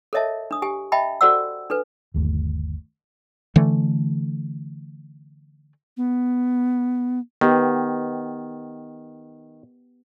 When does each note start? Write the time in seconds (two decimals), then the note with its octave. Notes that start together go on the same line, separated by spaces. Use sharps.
0.13 A4 A#4 C#5 D#5 E5 A5
0.51 D4 D#6
0.62 G4 G#5
0.92 D#5 E5 G5 A5 B5
1.21 F#4 A4 C5 D5 F#5 E6
1.70 D4 A4 B4
2.14 G1 D#2 A3
3.56 D3 E3 A3
5.97 B3
7.41 D#3 B3 G4